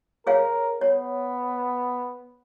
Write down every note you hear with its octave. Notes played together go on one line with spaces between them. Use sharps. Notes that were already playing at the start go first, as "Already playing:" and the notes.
G#4 A#4 C#5 F5
B3 C#5